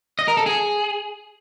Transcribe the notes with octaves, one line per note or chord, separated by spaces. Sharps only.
D#5
A#4
A4
G#4